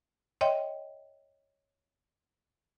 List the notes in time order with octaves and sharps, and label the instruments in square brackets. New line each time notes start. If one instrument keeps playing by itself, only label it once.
[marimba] C#5 D#5 E5 G5 C6